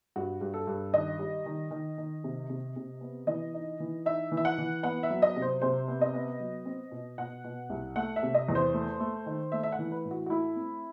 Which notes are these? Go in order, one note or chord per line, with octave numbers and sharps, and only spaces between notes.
G2 F#4
G2
A4
G2
D#3 D#5
G3
D#3
D#3
D#3
C3
C3
C3
B3
E3 D#5
D#4
E3
D#4 E5
E3
E5
F#5
E3
B3 F#5
E5
F#3
D#5
C3
C5
C3 C5
B3
D#5
B3
F#3
C4
B2
B2 F#5
B2
C2
A3 F#5
E5
C3
D#5
E2
C5
A3
A3
D#3
A3 E5
E5
F#5
E3
B4
A2
F#4
F#4
A3 E4
C4